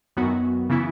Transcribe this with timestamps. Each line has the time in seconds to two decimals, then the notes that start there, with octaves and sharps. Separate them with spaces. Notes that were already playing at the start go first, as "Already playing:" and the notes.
0.17 F#2 D#3 F#3 B3 F#4
0.69 C#3 E3 B3 E4